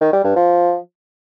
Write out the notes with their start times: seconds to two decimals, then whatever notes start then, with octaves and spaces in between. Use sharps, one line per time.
0.01 D#3
0.13 G3
0.24 G2
0.36 F3